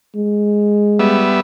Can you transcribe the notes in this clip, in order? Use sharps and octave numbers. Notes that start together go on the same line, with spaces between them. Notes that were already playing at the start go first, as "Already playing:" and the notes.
G#3
G3 B3 E5